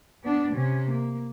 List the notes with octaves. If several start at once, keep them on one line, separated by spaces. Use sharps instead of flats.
B3 D4
C3 C#4
A#3